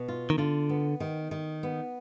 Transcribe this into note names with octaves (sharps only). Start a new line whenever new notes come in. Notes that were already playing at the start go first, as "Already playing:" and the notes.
Already playing: B2
F4
D#3
D3 F4
B3
D#3
D#3
B3